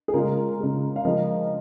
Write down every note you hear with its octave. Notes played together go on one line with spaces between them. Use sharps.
G#4
C#3 G#3 F4 A#4
C#3 G#3
F5
C#3 F3 G#3 A#4 D#5